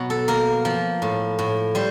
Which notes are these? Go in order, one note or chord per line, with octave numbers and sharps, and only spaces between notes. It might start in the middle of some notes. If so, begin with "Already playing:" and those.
Already playing: B2 F#3
A4
A#3 A#4
F3
A2
A2
G3 C5